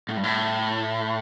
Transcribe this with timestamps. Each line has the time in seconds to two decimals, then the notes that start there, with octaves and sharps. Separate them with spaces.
0.09 A2
0.16 G2
0.23 A2